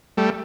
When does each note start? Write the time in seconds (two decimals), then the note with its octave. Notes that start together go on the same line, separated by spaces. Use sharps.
0.17 G3 A3